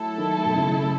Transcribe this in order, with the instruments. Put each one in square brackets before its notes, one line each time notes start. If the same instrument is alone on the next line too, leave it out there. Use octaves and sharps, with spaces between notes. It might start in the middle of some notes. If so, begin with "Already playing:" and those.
Already playing: [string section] F#3 A3 E4 A4
[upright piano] D#3
B2
C#3